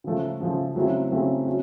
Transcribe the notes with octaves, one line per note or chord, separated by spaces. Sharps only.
C#3 F3 A3
C#3 F3 A3
C#3 F#3 A3 C4 E4
C#3 F#3 A3 C4 E4
C#4 F#4